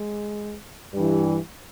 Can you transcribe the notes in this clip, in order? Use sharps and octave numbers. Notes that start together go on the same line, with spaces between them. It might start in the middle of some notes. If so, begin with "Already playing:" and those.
Already playing: G#3
G2 E3 G3